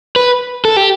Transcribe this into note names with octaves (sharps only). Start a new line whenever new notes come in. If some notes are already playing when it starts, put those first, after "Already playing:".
B4
A4
G4